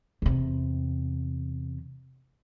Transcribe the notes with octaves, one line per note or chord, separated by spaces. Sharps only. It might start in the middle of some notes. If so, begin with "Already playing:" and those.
E2 C3